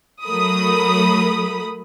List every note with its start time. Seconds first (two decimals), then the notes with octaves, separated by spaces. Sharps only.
0.24 F#3 A3 A#4 B5 D#6